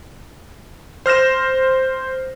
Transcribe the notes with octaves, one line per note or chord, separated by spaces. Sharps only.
C5 F6 A#6 E7